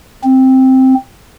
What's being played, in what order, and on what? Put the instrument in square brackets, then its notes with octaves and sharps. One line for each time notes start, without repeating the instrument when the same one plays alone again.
[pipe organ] C4